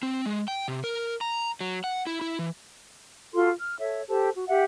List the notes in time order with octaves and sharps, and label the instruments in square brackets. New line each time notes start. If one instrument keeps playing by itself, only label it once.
[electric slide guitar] C4
G#3
G5
C3
A#4
A#5
F#3
F#5
E4
E4
E3
[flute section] F4 F#4 A4 C6
F6
A4 C#5 E5
G4 A4 C5 A5
F#4
G4 E5 F#5